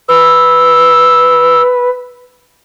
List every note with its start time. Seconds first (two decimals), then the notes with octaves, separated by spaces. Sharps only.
0.08 B4 E6